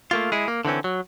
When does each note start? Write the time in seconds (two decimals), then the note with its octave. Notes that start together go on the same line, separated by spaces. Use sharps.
0.11 A3 A#3 F4
0.32 G#3 E4 G#4
0.48 A#3
0.65 D3 E3 C4 C#4
0.84 F#3